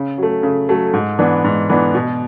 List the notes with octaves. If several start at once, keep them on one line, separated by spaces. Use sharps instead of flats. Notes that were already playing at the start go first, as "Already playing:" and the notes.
Already playing: C#3
F#3 A3
C#3
F#3 A3
G#2
E3 B3 D4
G#2
E3 B3 D4
B2